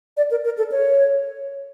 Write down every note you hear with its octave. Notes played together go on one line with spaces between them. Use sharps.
D5
A#4
A#4
A4
C#5